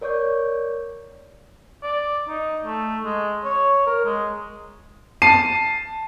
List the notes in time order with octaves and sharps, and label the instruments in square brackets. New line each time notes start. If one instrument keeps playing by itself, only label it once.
[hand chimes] A#4 C#5 D5 C#6 G6
[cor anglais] D5
D#4
A3
G#3
C#5
A#4
G#3
[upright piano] A5 C7 D#7